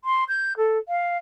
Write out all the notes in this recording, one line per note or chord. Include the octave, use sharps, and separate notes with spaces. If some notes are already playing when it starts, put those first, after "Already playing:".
C6
G6
A4
F5